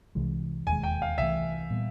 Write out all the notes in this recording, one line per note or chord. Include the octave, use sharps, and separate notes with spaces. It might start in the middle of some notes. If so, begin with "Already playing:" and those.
C2 C3 E3 G#3
E1 D#2 D#3 G#3 G#5
G5
F5
C2 C3 E3 A3 E5
A#2 G3 B3